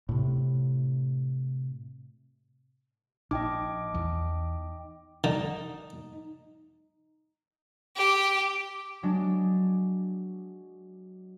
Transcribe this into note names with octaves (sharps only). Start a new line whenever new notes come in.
A2 C3
A#1 D#4 D#5 G5 D6
E2
D3 D#4
G4
F#3 G#3 D4